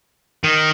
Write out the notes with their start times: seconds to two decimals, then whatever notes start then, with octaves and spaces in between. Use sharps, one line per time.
0.44 D#3